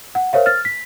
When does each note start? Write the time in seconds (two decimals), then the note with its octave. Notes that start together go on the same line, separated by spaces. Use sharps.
0.15 F#5
0.33 A#4 C5 C#5 E5 F5
0.46 F6 A6
0.65 B6